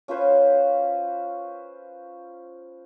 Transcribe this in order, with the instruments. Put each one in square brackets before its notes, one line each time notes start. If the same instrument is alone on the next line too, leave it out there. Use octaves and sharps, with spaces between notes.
[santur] C#4 F4 B4 C5